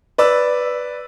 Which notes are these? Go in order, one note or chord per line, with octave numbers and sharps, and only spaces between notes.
B4 D5 E6